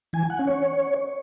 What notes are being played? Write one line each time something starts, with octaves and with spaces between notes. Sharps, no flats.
E3 G#5
F#5
C#4
C#5